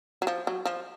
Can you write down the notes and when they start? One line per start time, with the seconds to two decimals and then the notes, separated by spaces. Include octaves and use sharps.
0.22 F#3
0.27 F3
0.47 F#3
0.66 F3